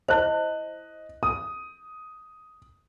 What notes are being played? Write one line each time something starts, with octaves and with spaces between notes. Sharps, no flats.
E4 C5 D#5 F#6
D#6